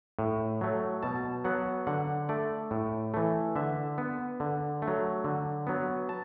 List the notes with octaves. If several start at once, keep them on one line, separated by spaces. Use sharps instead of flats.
A2
F#3 A3
B2 A5
F#3 B3 F#5
D3 F#5
A3 D5
A2
E3 A3
D3 E5
B3
D3
A3
F#3
D3
F#3 B3
A5